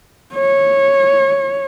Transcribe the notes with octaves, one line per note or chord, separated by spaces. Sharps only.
C#5